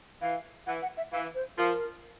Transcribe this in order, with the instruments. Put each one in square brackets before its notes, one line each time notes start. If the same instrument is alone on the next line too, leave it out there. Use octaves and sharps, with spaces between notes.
[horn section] E3 [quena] F5
[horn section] E3 [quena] F#5
[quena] F#5
E5
[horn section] E3 [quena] F5
[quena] C5
[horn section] F3 [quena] A#4